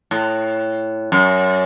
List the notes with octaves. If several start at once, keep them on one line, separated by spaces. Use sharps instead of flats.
A2
F#2